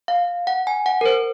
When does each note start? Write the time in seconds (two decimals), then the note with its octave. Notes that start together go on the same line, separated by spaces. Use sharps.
0.08 F5
0.47 F#5
0.67 G#5
0.86 F#5
1.01 A#4
1.06 C5